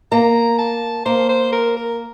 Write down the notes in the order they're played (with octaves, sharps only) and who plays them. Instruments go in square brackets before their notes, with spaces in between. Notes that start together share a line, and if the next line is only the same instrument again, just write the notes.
[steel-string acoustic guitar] A#3 [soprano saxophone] A#5
[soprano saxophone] A5
[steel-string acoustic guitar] A#3 [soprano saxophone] C5
[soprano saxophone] C5
A#4
A#4